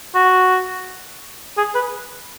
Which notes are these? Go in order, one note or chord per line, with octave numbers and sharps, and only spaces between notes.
F#4
G#4
B4